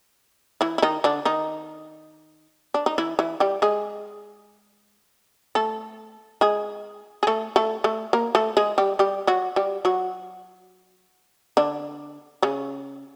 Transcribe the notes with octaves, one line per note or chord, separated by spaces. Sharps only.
E3 E4
E4
D#3 D#4
D3 D4
D#3 D#4
D4
D#4
E3 E4
E3 E4
G3 G4
G#3 G#4
A3 A4
G#3 G#4
G#4
A3 A4
A3 A4
A3 A4
A#3 A#4
A3 A4
G#3 G#4
G3 G4
G3 G4
F#3 F#4
G3 G4
F#3 F#4
D3 D4
C#3 C#4